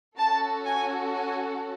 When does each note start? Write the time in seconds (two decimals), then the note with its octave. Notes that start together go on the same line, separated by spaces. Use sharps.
0.17 C#4 F#4 A4 A5
0.66 G#5
1.14 G#5